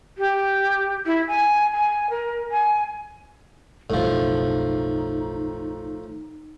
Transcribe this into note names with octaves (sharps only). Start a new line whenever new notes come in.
G4
E4
G#5
G#5
A#4
G#5
F#1 B1 A2 F3 D#4